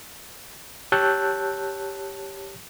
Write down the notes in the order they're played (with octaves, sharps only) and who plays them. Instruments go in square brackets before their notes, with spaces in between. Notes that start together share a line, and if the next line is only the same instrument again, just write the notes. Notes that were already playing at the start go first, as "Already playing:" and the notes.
[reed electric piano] G4 C#5 A5 E6 F#6 G6